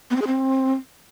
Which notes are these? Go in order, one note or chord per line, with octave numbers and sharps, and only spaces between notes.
B3
C4
G#4
C4